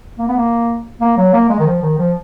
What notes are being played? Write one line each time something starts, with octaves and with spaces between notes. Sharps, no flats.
A#3
B3
A#3
A#3
F#3
A#3
G#3
D#3
F3
D#3
F3